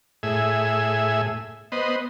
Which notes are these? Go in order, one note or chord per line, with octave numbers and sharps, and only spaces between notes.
A2 G#4 E5
B3 C5 D#5